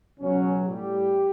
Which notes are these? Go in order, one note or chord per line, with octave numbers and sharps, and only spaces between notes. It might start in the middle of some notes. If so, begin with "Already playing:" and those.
C#2 B2 F#3 C#4
A2 G3 G4